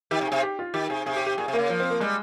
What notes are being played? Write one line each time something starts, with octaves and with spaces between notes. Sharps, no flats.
D#3 G4
C3
G#4
C3
G4
F4
D#3 G4
C3 G#4
C3 G#4
G4
G4
A#2 G#4
C3
A#3
C#3
F3 A#3
C4
A#3
G3 G#3